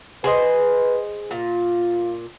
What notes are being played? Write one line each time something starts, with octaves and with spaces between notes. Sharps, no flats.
G#4 B4 C5 D#5
A#2 F4